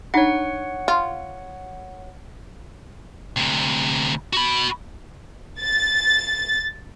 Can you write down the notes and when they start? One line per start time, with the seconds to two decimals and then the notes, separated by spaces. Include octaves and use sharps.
0.14 D4 D#4 C#5 F#5
0.88 F4
3.37 D2 C3
4.33 F#4 B5
5.61 A6